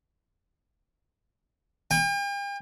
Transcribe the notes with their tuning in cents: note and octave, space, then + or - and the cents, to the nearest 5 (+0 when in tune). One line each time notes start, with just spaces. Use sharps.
G5 +45